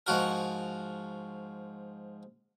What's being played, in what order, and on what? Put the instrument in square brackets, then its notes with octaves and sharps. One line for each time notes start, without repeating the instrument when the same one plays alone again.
[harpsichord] G#2 F3 F#4 A#4